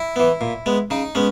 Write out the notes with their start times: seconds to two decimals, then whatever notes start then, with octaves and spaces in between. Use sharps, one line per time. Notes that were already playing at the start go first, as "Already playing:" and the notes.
Already playing: E4
0.16 E3 B3
0.41 A#2
0.66 G#3 B3
0.90 C#3 D#4
1.15 G#3 B3 C#4